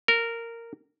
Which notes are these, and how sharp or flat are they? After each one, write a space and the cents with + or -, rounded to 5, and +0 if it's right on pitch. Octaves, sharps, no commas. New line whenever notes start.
A#4 -10